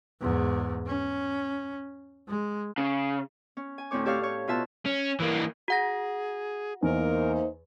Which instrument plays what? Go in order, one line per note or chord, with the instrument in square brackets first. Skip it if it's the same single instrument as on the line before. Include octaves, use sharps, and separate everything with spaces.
[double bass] E2 G#2
C#4
G#3
[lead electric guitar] C#3
[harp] C#4
G#5
D2 A2 C4 C#5 D6
G4 A4 C#5 D5 F5
C#5
B2 F4 E5 A5 F#6
[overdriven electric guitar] C#4
E3 A#3
[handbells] F#4 F#5 A#6 [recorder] G#4
[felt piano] E2 [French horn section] A#3 D#4 C5 [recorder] A#4